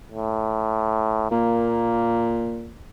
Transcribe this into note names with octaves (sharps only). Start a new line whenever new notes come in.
A2
A#2 A#3